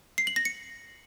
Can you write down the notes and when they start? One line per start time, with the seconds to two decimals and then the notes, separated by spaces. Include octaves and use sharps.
0.18 C7
0.27 F#7
0.36 A#6
0.45 C#7